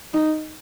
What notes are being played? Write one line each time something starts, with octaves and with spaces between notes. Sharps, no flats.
D#4